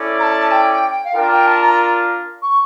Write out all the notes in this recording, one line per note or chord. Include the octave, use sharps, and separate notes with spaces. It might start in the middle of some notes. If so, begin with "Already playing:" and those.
Already playing: C#4 E4 A4 D5
A#5
A5
G5
F5
D4 F4 A#4 G5
G5
A5
A#5
C#6